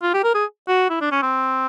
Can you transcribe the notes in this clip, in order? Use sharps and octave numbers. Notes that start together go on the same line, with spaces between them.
F4
G4
A#4
G#4
F#4
E4
D4
C#4
C4